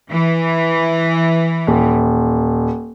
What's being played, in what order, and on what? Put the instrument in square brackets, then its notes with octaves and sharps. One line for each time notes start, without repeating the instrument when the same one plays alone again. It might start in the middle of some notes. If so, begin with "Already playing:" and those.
[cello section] E3
[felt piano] D#1